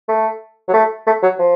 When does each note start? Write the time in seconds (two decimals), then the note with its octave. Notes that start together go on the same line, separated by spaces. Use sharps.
0.08 A3
0.68 F#3
0.73 A3
1.07 A3
1.23 F#3
1.39 F3